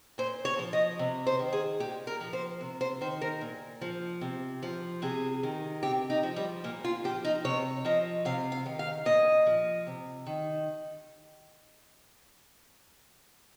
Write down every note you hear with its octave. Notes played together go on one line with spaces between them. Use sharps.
A#2 C5
C#5
F3
D#5
C3
C5
D#3
G#4
A#2 G4
A#4
F3
C5
C3
C5
D#3 C5
A#4
A#2
F3
C3
F3
C3 G#4
D#3
C3 G4
D#4
F3
G3
A#2 A#3
F4
F3 G4
D#4
C3 C#5
F3 D#5
C3 F5
F5
D#3
F5
A#2 D#5
F3
C3
D#3